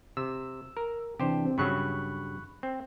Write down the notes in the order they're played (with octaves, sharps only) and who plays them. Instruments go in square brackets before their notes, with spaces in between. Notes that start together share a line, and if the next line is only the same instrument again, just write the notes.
[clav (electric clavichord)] C3 [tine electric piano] E6
[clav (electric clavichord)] A#4
[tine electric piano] C3 E3 D4 [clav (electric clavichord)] G4 C5
[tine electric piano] C4
[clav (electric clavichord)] G2 C#3 F#3 [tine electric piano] B5 C#6 F#6
[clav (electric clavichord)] C4